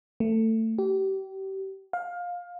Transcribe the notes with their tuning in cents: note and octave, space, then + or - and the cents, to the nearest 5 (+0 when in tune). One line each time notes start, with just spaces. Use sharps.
A3 +20
G4 -30
F5 +20